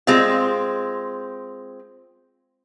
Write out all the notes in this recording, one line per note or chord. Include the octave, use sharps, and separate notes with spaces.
G#3 C4 F4